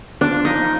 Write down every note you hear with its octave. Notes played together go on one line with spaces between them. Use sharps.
F3 A#3 D4 F4
D#4